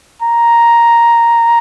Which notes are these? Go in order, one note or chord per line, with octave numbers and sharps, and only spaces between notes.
A#5